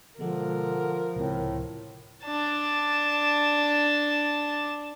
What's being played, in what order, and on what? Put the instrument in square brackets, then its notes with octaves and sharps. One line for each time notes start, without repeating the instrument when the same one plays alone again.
[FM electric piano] B2 G#3 [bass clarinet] D3 [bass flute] F3 [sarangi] A#4
[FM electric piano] C#2 C3 [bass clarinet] A2
[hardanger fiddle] D4 A5